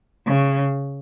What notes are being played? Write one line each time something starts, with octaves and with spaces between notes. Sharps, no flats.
C#3